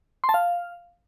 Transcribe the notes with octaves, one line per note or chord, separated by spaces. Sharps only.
C6
A5
F5